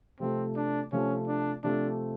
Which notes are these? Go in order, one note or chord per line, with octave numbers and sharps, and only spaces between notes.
C3 F3 A3 C4
D4
C3 F3 A3 C#4
D4
C3 F3 A3 C4 D4